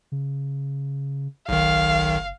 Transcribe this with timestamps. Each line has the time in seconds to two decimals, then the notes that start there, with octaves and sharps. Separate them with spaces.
0.12 C#3
1.49 F#1 B1 D#3 F5